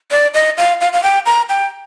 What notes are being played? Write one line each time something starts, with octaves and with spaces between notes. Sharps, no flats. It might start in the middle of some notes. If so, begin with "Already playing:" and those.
D5
D#5
F5
F5
F5
G5
A#5
G5